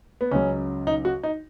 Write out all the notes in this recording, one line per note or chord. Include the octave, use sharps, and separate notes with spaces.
B3
C#2 C#3 F#3 C#4
D#4
F#4
D#4